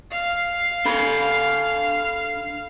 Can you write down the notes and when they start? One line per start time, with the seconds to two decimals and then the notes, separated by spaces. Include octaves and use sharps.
0.11 F5
0.85 D4 A4 B5